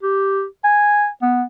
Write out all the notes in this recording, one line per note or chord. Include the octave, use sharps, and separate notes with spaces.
G4
G#5
B3